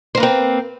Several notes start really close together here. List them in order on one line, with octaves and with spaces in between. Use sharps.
C5 A#3 B4 C4